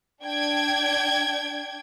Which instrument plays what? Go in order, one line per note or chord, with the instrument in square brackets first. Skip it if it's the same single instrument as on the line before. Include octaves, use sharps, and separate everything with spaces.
[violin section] D4 G5 G#6